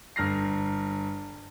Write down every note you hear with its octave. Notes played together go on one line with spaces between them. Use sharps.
G1 F6 A#6 C7